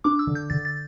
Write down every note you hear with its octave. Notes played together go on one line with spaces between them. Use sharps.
D4 D6
E6
D3
G6
D3 A6
A6